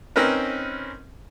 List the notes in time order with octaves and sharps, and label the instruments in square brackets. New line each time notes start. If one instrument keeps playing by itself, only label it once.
[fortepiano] C4 C#4 D#4 A#4 B4